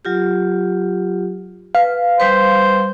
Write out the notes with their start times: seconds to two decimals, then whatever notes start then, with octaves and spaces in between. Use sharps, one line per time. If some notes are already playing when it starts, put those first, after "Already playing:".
0.05 F#3 F4 G4
1.75 B4 F5
2.20 G3 B4 C5